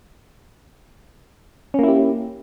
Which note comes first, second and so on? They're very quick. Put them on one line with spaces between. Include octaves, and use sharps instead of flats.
C#4 A#3 E4 G4